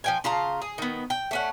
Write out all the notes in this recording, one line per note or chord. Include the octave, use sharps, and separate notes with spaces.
F3 G5 G#5
C#3 F4 A5 A#5
G#4
D#3 B3
G5
A3 C#4 F#5